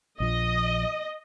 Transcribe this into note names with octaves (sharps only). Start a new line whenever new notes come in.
A#1 F3 D#5